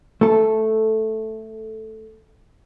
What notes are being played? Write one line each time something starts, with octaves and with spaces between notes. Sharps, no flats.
A3 A4